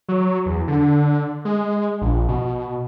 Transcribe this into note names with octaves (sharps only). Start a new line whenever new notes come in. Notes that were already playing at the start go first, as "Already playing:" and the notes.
F#3
E2
D3
G#3
A#1
B2